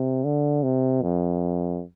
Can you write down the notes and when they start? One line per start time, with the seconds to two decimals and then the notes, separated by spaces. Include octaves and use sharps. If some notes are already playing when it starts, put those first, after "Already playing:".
Already playing: C3
0.24 D3
0.63 C3
1.02 F2